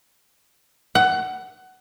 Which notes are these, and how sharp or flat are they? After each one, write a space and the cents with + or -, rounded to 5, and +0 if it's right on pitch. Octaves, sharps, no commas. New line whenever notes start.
F#5 +20